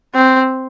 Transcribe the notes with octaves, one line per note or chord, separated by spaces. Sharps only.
C4